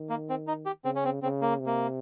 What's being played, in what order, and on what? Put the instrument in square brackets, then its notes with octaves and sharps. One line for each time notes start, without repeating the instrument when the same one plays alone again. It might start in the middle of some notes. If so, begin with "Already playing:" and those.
Already playing: [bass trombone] D#3
[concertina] A#3
C4
D#4
G4
[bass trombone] C#3 [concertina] C4
[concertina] C#4
C4
[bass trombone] C#3 [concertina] C4
[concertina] A#3
[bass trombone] C3
[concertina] A#3